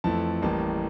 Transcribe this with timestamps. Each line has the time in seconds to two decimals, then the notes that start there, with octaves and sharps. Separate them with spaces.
0.04 F2 E3 A3 A5
0.42 A1 A2 G3 A#3 A5